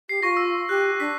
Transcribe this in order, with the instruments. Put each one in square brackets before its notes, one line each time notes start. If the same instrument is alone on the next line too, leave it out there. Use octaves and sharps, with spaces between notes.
[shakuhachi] G4 [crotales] C7
[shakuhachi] F4 [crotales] C#6 A#6
[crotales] E6
[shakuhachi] G4 [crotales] F#6
[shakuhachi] D4 [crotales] B6